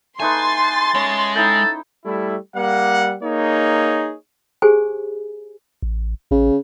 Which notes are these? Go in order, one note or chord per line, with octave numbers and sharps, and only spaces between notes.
A3 D#4 B4 G#5 C6 A6
G#3 C#4
D#4 E4 A4 G5
G3 A3 E4
G3 A#3 F#5
A#3 D#4 G#4 C#5
G4 G#4 C5 G#5
A1
A1 C#3